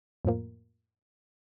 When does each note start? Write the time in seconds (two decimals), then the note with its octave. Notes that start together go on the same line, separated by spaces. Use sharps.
0.25 F2 A2 F3 A#3